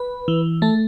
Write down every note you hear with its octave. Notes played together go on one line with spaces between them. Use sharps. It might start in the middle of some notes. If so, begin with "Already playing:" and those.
Already playing: B4
E3
A3 A4